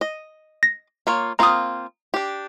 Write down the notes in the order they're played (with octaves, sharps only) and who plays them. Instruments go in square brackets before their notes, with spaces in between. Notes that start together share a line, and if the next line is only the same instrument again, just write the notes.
[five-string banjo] D#5
[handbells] A#6
[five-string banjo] A#3 F4 C#5
[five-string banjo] A#3 C4 F4 [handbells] A#5 D#6
[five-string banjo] D4 G4